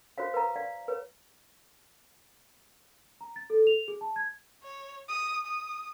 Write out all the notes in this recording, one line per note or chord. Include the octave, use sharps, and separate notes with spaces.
F#4 C5 C#5 F5
B4 F5 A#5
D5 F5
B4 C#5
A#5
A6
A4
F7
G#4
A5
G#6
C#5
D#6
D#6